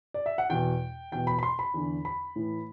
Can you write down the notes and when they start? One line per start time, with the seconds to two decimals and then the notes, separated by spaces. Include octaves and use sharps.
0.14 D5
0.26 E5
0.38 F#5
0.50 E2 B2 G5
1.12 E2 B2 G5
1.27 B5
1.39 B5
1.43 C6
1.59 B5
1.74 E2 D3
2.05 B5
2.36 A2 E3